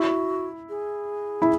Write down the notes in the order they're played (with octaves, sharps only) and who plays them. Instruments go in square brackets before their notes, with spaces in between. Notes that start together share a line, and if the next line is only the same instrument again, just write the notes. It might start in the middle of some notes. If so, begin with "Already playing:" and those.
Already playing: [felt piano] E4 [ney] F#4
[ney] G#4
[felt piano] E4